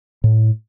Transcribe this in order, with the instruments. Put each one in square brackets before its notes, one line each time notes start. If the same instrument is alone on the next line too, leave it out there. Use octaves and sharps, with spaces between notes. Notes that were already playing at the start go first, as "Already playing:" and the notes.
[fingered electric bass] A2